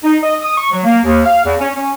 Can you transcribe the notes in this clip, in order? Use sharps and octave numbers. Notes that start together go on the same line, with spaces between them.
D#4
D#5
D#6
C#6
F#3
A#3
D#2
F5
E2
C#4
C#4